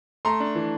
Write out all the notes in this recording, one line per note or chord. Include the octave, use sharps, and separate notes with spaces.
A3 A#5 C6
D4
E3